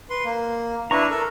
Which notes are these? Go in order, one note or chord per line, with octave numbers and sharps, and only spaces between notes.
B4 C6
A#3
D4 E4 B4 A#5 C#6
A4 A#4